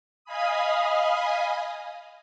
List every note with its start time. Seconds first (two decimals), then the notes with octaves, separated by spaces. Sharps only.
0.24 D#5 F5 G#5 B5 D#6